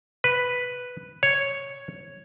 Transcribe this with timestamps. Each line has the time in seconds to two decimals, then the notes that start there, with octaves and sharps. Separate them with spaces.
0.24 B4
1.23 C#5